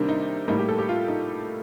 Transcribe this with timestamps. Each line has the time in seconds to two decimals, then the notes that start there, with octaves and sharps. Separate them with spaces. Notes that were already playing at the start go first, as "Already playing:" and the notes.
Already playing: C3 D#3 G3 A#3 D4
0.08 D#4
0.48 A2 G3 A#3 D#4
0.58 G4
0.69 A4
0.78 G4
0.89 F4
1.08 D#4